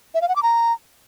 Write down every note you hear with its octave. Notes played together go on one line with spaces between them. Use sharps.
E5
F5
F#5
D6
A#5